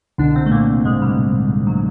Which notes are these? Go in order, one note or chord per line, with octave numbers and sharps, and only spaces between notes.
C2 B2 D3 D4
C3 C4
A3
A#2 A#3
G#2 G#3
G3
F#3